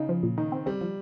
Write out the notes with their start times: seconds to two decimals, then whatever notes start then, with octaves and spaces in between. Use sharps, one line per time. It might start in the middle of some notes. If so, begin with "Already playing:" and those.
Already playing: C#3 D#4
0.09 F3
0.23 A#2
0.38 D#3 D#4
0.52 C4
0.66 G3 C4
0.81 F3